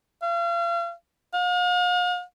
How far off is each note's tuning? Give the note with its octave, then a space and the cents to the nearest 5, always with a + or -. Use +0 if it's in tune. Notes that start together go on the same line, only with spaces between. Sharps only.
F5 -35
F5 +45